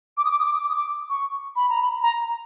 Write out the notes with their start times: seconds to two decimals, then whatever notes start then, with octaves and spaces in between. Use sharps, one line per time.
0.17 D6
0.25 D#6
0.31 D6
0.39 D#6
0.46 D6
0.53 D#6
0.61 D6
0.69 D#6
0.76 D6
1.10 C#6
1.56 B5
1.70 A#5
1.82 B5
2.02 A#5